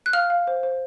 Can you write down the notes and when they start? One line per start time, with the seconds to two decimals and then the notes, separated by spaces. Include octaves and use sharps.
0.06 F#6
0.13 F5 F6
0.30 F5
0.47 C5
0.63 C5